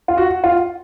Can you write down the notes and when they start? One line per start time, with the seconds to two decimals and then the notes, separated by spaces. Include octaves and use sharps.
0.08 F4
0.17 F#4
0.44 F4